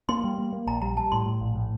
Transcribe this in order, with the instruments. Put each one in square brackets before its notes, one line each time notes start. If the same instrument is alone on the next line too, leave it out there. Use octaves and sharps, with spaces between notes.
[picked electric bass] A#3 [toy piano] C6
[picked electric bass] G3
A#3
A#3
[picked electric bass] A#1 [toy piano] A#5
[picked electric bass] G3 [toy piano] A#5
[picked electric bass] G3 [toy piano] A5
[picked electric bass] A2 [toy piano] C6
[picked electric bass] A2
A#1
A2